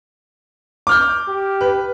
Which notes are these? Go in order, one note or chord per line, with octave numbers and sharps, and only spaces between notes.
D6 F6 G6
G4
B4